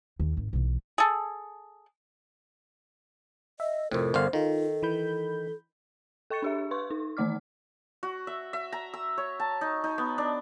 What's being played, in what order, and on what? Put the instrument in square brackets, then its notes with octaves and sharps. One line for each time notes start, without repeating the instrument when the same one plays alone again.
[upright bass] D#2
G#1
B1 E3
[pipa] G#4 A4
[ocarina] D#5 [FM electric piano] E5
[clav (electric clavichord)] F2 A2 [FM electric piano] C3 C4 [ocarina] A#4
[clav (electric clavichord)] G1 D3 F5 [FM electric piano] C5
[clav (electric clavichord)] D#3 [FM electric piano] D#4 F4 [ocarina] A4
[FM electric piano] E3 B5 G6
[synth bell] A4 G5 C#6 A6 C#7
D4 G4 E5
B4 C6 C#6
D#4
D#3 E3 A3 D5 D6 F6
[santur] F#4
E5
E5
A#5
E6
C#5
A5
D#4
D#4
B3
D4